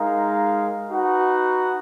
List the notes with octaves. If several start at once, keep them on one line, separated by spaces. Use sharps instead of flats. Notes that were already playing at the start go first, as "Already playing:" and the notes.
Already playing: G#3 D#4 A#4 F5
D#4 F#4 B4 F#5